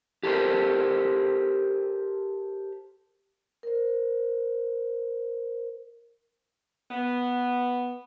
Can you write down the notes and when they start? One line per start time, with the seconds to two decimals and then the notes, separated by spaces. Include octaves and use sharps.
0.23 G4 A4 A#4 C5
3.63 A#4 C5
6.91 B3